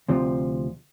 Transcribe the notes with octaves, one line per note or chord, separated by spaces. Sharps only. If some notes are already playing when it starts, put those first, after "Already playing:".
D2 C3 F3